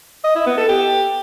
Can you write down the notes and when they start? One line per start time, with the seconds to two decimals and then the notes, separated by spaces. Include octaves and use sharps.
0.24 D#5
0.35 E4
0.46 B3
0.57 A4
0.68 G4